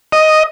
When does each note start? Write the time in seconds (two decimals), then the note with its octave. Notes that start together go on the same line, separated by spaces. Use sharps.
0.12 D#5